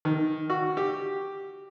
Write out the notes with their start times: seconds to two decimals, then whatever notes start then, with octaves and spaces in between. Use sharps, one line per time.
0.05 D#3
0.50 F#4
0.77 G4